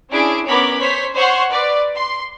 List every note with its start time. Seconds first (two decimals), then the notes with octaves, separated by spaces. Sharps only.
0.10 C#4 D4 E4 G#4 D7
0.48 B3 C#4 A#4 C#5 B5 D6
0.79 C5 C#5 B6
1.14 C5 C#5 F#5 C6 C#6
1.50 B4 D5
1.96 C6